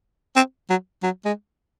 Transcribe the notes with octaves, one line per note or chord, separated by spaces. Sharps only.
C4
F#3
F#3
G#3